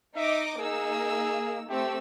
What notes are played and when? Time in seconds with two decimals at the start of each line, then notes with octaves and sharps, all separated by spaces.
0.16 D#4 D#5 E5 D6
0.60 A#3 D#4 G#4 E6
1.69 A3 C4 G4 E6